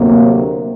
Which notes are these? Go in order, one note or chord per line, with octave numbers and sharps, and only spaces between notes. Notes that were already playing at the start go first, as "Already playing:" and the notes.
Already playing: D2 C3 F#3 A#3